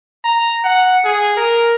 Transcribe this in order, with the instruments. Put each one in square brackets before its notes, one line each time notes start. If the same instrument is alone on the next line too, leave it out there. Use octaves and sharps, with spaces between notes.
[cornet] A#5
F#5
G#4
A#4